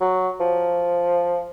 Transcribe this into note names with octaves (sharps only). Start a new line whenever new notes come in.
F#3
F3